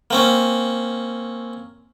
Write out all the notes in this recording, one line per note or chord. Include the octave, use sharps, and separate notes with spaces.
A#3 C4 C#4